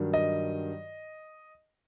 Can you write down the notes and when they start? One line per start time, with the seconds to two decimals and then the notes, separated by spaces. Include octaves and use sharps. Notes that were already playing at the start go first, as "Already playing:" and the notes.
Already playing: G2 D#3 F#3
0.14 D#5